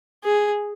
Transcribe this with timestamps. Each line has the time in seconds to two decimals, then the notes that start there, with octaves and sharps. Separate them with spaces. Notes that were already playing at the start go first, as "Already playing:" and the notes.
0.24 G#4